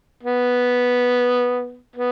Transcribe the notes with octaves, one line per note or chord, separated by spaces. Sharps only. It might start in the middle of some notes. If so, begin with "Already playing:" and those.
B3
B3